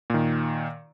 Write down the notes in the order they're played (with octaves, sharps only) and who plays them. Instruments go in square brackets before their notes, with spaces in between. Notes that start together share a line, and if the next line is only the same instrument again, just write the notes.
[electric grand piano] A#2 D#3